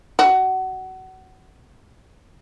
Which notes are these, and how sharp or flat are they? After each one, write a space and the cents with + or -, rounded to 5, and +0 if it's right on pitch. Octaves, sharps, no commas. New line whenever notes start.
F#4 +20